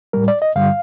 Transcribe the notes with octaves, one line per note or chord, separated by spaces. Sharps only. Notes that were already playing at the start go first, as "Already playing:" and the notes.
A2 G3 A#4
D5
D#5
G2 D3 G3 F5